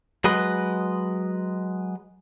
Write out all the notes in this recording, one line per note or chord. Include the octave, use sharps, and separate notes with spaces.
F#3 G#3 B4 D#5